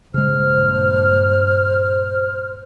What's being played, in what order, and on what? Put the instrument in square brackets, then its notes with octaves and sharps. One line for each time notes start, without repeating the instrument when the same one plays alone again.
[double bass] A#1 G2 [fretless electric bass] C#3 G#3 [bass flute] C5 [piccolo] F6